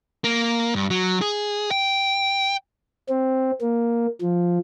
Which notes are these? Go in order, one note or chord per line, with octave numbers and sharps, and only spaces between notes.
A#3
G2
F#3
G#4
G5
C4
A#3
F3